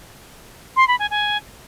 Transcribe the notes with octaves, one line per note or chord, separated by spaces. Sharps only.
C6
B5
G#5
G#5